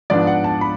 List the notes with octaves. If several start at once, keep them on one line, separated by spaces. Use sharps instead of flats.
G#2 F3 B3 D4 D5
F#5
A5
B5